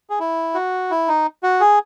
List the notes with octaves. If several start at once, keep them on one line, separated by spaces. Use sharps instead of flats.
G#4
E4
F#4
E4
D#4
F#4
G#4